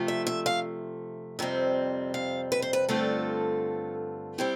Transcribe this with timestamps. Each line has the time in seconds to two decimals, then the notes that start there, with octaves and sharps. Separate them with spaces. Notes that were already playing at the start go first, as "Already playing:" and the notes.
Already playing: C3 F3 A3
0.08 E5
0.27 E5
0.46 F5
1.39 F2 C3 G3 C4
2.14 F5
2.52 B4
2.62 C5
2.73 B4
2.89 G2 D3 A3 C4 F4 A4
4.38 G3 C4 E4 G4